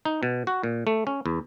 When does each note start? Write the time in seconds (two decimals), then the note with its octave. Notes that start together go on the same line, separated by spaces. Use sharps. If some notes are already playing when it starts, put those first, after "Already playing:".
0.05 D#4
0.23 B2
0.47 F#4
0.63 A#2
0.87 A3
1.07 C#4
1.26 E2